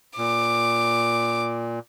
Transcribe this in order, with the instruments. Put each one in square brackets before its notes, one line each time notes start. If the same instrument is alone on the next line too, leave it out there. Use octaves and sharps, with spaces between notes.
[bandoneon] A#2 [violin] D6